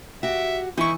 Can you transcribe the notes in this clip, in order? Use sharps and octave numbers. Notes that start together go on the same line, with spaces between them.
F#4 G4 E5
E3 D#4 E4 C#6